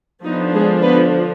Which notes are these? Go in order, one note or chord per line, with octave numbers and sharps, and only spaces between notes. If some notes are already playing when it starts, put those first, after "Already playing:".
D3 F3 B3 D4 D#4
G#3 G#4
B3 B4